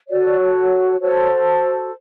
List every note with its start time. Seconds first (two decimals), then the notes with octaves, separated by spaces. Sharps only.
0.08 F#4 A4 C#5 D5
1.00 F#4 A4 C5 C#5